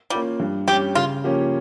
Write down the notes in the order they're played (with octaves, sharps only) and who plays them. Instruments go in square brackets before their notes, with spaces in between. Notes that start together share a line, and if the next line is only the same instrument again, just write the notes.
[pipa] G3 [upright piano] A#3 C#4 F4
[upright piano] G2
[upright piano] G3 C#4 [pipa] G4
[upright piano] C#3 [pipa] F4
[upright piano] F3 A#3 C#4 G4